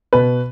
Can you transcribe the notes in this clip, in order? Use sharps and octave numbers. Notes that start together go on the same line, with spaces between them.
B2 B4